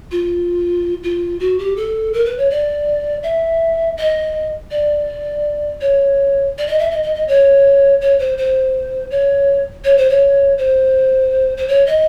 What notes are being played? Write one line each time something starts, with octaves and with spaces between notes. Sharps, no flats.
F4
F4
F#4
G4
A4
A#4
B4
C#5
D5
E5
D#5
D5
C#5
D5
D#5
E5
D#5
D#5
D#5
C#5
C#5
C5
C5
C#5
C#5
C5
C#5
C5
C5
C#5
D#5